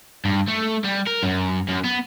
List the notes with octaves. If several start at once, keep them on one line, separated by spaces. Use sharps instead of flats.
G2
A3
G3
A#4
F#2
F#2
B3